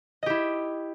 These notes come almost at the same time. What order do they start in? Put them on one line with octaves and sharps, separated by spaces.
D#5 G4 E4